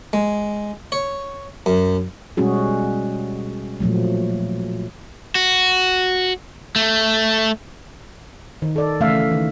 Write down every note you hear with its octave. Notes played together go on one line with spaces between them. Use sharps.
G#3
C#5
F#2
B2 G3 G#3 C#4 F#4 G#4
A#2 F3 F#3 A3
F#4
A3
D#3
A4 D5
C#3 E3 A3 E5 F5
D#3